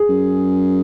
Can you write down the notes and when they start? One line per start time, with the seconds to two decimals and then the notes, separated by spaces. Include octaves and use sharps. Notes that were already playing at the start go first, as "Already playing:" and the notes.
Already playing: G#4
0.09 F#2